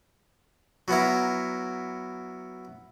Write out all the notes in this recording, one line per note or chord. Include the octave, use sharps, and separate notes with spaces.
F#3 B3 E4 A#4